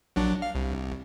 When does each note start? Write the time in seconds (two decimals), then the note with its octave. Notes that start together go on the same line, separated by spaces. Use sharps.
0.16 A#1 F#3 D4
0.42 F5
0.55 C2